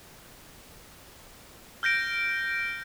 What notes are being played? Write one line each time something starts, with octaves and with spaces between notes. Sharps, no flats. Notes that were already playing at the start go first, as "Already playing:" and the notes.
F6 G6 A#6 D7